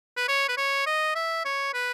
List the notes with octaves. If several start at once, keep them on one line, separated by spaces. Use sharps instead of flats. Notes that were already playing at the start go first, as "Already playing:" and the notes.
B4
C#5
B4
C#5
D#5
E5
C#5
B4